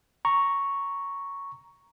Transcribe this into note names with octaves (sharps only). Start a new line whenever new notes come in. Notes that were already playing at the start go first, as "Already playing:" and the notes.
A#5 C#6